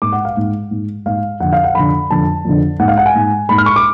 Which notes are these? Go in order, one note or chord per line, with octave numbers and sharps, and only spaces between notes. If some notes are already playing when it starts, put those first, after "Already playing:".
G#2 D6
F#5
F5
G#2
G#2
G#2 F5
F2 D3 F#5
F5
F#5
F2 D3 B5
F2 D3 A5
F2 D3
G#2 F#5
F5
F#5
G#5
G#2
G#2 B5
F6
C#6
D6